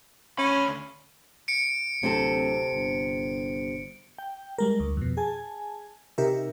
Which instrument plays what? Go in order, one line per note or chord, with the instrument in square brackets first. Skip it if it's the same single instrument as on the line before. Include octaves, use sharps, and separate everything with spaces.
[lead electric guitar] D2 B5 [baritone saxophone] C#4
[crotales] C#7 D7
[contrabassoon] D1 [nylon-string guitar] C3 C4 A4
[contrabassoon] G1
[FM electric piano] G5
G3 G#3 A#4
D2
F2 B2
G#4 G#5 A5
C3 D#4 G4 A#4 E5